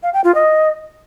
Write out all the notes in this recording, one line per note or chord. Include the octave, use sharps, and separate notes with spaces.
F5
G5
F4
D#5